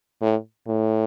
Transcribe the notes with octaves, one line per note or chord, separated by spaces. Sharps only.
A2
A2